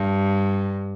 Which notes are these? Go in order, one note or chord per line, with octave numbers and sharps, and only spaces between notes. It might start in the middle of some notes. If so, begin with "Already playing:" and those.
Already playing: G2